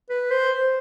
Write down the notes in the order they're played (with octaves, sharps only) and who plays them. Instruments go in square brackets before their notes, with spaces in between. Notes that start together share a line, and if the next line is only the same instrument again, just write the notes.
[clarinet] B4
C5